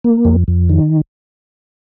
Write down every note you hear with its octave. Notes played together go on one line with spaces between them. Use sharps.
A#3
F2
F2
D#3